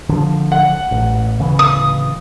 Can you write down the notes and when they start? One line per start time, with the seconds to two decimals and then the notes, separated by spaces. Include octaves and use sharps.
0.09 D3 F3
0.52 F#5
0.91 A1
1.39 D1 C#3 E3
1.59 D#6